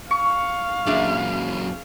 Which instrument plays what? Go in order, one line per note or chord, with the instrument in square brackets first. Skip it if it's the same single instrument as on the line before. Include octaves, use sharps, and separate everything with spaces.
[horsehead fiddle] F5 [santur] C#6
[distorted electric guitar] F#2 A#2 [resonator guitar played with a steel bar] D4 G#4 E5